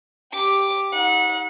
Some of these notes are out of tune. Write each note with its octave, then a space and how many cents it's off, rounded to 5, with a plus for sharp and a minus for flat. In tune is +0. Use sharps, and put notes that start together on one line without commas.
G4 +0 D6 +0
D#4 +45 F#5 -25